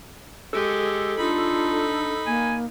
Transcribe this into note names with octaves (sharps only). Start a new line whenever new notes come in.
G#3 G4 A4
D4 D#4 F4 B5
A#3 G#5